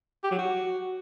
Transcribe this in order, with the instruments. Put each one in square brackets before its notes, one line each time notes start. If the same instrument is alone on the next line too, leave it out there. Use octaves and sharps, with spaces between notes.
[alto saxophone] G4
F#3
F#4